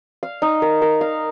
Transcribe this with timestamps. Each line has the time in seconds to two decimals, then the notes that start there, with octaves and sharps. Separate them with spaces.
0.23 F5
0.42 D#4
0.62 A#4
0.82 A#4
1.01 F5